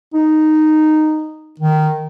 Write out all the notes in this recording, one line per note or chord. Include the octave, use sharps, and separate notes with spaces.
D#4
D#3